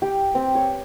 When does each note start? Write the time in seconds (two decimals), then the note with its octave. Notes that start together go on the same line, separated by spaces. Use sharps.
0.02 G4
0.35 C4
0.55 C#5